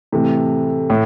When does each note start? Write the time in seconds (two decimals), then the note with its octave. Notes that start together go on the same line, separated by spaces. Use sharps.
0.12 A2 C3 E3 A3
0.90 A2